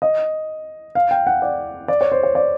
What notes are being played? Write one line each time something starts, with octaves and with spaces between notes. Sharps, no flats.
D#5
F5
G5
F#5
D5
D5
C#5
C5
C#5
D5